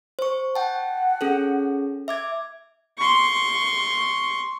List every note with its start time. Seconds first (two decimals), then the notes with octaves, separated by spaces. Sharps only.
0.19 C5 C#6
0.55 F#5 G5 A5
1.21 C#4 G#4 A4
2.08 E5 D6 G#6
2.98 C6 C#6